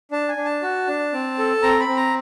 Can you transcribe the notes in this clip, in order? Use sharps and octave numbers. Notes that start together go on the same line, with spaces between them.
D4 A5
G#5
D4
A5
F#4
D4
C4
A4
C4 A#5
B5
C4
A#5